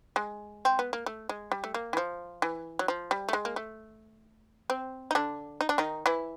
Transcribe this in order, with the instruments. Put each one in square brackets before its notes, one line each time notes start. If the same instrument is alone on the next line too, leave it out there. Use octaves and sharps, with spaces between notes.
[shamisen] G#3
C4
B3
A#3
A3
G#3
G3
A3
A#3
E3
F3
E3
F#3
F3
G3
A3
G#3
A#3
A3
C4
D#4
D3 D4
D#4
D4
D#3 D#4
E3 E4